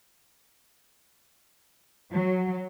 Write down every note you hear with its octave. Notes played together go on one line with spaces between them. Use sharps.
F#3